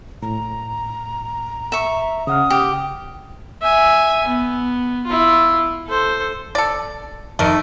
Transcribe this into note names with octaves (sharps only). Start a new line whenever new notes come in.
A2 A#5
E5 C#6
C#3 F#5 D#6 F6
G4
E5 G#5
B3
E4 F4
A4 C5
A4 D5
F2 D#3 A3